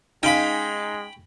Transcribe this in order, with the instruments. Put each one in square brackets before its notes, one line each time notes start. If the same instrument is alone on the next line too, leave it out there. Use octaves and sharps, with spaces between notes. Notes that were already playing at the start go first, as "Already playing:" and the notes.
[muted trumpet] G#3 [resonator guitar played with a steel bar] C#4 F5 [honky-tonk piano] D#4 [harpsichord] G5 B5